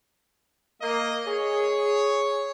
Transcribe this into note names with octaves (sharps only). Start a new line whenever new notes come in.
A#3 D#5
G#4 C#5